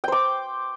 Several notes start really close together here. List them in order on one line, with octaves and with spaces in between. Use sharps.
G5 C5 D6